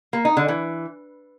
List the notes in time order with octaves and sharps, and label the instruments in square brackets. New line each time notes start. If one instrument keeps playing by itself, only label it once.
[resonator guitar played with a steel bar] A#3
D#4
D3
E3